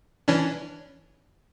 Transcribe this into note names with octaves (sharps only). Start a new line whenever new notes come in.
E3 C#4 D4